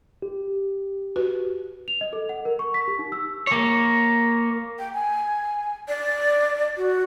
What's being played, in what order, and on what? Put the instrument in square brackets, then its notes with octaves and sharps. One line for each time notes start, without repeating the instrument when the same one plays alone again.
[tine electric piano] G4
[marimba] F#4 B4
[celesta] F7
D#5
A4
F#5
A#4
C#6
B6
G4
D#4
E6
[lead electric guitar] A#3 C#5
[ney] G5
G#5
D5
F#4